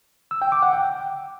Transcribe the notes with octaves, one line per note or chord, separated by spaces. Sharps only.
E6
G5
D6
F#5
G5